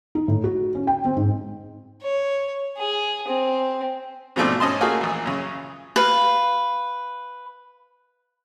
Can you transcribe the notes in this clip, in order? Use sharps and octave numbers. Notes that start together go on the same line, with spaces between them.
D#4
A2
F#4
C#4
G5
C4
G#2
C#5
G#4
C4
G#2 B2 F3 A3 C4 D4
G#2 C#4 D#5 A5 C6
A3 A#3 F4 F#4 G#4 A#4
A#1 E3
F#2 C#3
B4 F5